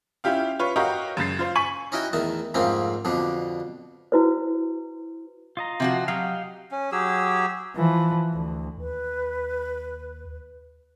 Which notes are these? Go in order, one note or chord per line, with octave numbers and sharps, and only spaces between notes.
C#4 E4 F4 G4 F5
F4 B4 C#5
F#4 G4 A#4 C#5 D#5 F5
F#2 C#3 A6 C7
F4 C5 F5
G#5 C#6 B6 D#7 F#7
C#4 D#4 E4 F#4 G5
E2 D#3 A3 A5
F2 G#2 C#3 A3 A#3 C4
F2 B2 D3 D4
E4 F#4 B4 C5
F4 D#5 A#5
C3 F3 F#4
F#3 G4 D#5 F5
C#4
F#3 G4 G#4 E6
E3 F3
D2
D#2 B4